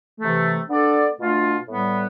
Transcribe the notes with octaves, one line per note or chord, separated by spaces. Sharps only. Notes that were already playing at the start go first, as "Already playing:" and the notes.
C3 E3 A3
B3 D4 A4 D5
B2 A3 D4 F4
A2 G3 B3